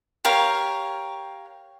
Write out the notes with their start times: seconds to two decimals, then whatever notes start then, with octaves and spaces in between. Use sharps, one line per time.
0.25 G4 A#4 C#5 F5